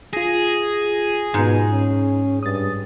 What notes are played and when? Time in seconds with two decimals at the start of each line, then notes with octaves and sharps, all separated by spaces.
0.13 F4 G#4 A#6
1.34 G#2 B2
1.71 C#4
2.43 G2 D#6 A6